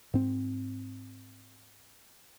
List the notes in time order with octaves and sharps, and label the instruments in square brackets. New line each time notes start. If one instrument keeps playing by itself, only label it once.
[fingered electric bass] G#2 C4